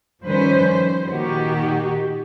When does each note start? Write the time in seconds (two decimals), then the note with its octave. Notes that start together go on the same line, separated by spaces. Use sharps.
0.24 D#3 F3 G3 C#4 B4 C5
0.73 C5
1.08 A#2 D#3 D#4 F#4 G4